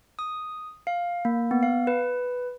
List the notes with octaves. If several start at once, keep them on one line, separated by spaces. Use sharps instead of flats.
D#6
F5
A#3
B3
F5
B4